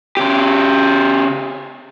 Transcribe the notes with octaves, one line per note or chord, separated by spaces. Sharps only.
C#3 G4